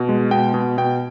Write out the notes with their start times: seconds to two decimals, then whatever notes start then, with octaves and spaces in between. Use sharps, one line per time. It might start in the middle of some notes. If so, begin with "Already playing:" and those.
Already playing: B2
0.09 G#3
0.31 B2 G5
0.54 B2
0.78 B2 G5